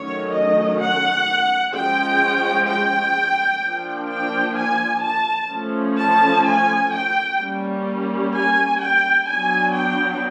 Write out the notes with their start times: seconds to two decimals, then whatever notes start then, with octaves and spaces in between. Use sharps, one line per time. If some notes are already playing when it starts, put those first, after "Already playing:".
Already playing: D#3 F#3 A3 C#4 C#5
0.32 D#5
0.79 F#5
1.73 F3 G#3 C#4 G5
2.67 G5
3.61 F3 A#3 D4
4.09 G5
4.56 G#5
5.03 A5
5.50 F3 A3 C#4
5.98 A5
6.45 G#5
6.92 G5
7.38 G3 A#3 C#4
8.34 G#5
8.80 G5
9.27 F#3 B3 D4 G#5
9.74 G5